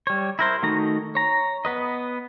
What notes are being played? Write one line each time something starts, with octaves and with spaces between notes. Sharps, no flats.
G3 C#5
E4 A#4 C5
D#3 A3 D#4 F#4 A#5
C#5 A#5
B3 B4 D#5